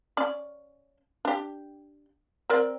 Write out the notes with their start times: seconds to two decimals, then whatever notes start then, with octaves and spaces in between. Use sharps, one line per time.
0.17 C#4 D5
1.25 D4 G4
2.50 C4 A#4 D5